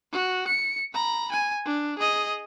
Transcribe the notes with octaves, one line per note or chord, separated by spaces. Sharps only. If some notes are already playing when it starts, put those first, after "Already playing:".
F#4
C#7
A#5 B5
G#5
D4
G#4 D#5